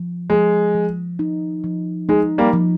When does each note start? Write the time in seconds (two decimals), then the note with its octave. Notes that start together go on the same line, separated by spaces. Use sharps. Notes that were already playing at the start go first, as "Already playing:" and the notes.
Already playing: F3
0.30 F3 G#3
0.75 F3
1.19 D#4
1.64 F3
2.09 G#3 D#4
2.38 G3 A#3
2.53 F3